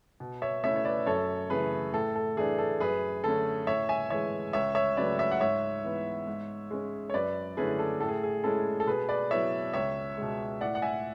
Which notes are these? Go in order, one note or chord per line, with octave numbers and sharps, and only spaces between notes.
B2
C#5 E5
A3 C#4 E4 C#5 E5
C#5
B4 D5
F#2 A4 C#5
C#3 E3 A3 G#4 B4
A2 A4
A4
E3 A3 D4 G#4
A4
F#2 G#4 B4
D3 A3 C#4 A4
A2 C#5 E5
E5 G#5
E3 G#3 C#5 E5
C#2 C#5 E5
C#5 E5
C#3 F#3 A3 B4 D5
C#5 E5
F#5
G#2 C#5 E5
E3 B3
G#2
G#3 C#4
C#5
F#2 B4 D5
D3 A3 C#4 E4 G#4 B4
A4
A2 A4
G#4
G#4
G#3 C#4 E4 A4
A4
B2 G#4 B4
B4 D5
F#3 B3 E4 C#5 E5
C#2 C#5 E5
B2 G#3
A2 D5 F#5
F#5
E5 G#5